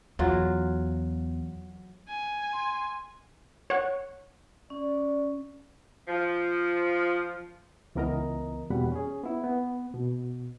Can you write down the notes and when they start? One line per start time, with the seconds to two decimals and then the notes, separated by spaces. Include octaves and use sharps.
0.19 E2 F#3 F4 F#4
2.09 G#5
2.52 C6
3.70 C#5 F#5 C#6
4.70 C#4 D5
6.08 F3
7.95 C#2 E3 B3 A#4 D#5 A#5
8.70 E2 B2 G3 F#5 B5
8.92 C#4 G#4
9.24 B3 E4
9.44 B3
9.94 B2